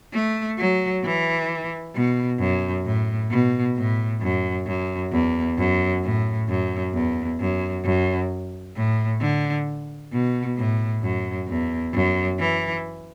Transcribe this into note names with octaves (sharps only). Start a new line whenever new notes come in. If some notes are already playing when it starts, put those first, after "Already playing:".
A3
F#3
E3
B2
F#2
A2
B2
A2
F#2
F#2
E2
F#2
A2
F#2
E2
F#2
F#2
A2
D3
B2
A2
F#2
E2
F#2
E3